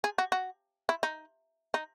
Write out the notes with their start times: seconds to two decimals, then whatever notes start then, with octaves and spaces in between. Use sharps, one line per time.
0.04 G#4
0.18 F#4
0.32 F#4
0.89 E4
1.03 D#4
1.74 D#4